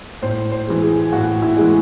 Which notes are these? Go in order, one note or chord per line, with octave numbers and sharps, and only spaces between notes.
A2 C5
C5
E3 G#3
G#4
A2 F#4
E4
E3 G#3